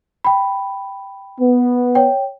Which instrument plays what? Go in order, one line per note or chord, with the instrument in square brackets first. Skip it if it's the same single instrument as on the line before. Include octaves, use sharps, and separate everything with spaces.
[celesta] G5 B5
[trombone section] B3
[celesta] C#5 G5